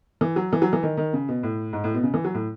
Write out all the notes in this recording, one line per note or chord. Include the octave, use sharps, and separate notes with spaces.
E3
F#3
E3
F#3
E3
D#3
D#3
C#3
B2
A2
G#2
A2
B2
C#3
E3
F#3
A2